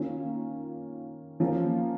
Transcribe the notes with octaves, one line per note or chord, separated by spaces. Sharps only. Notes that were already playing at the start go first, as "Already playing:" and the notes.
Already playing: D#3 A#3 C#4 F4
F3 A#3 C#4 F4